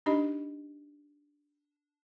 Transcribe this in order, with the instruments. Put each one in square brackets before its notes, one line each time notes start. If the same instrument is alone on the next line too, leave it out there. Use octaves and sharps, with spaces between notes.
[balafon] D4 D#4 G4 D#5 B5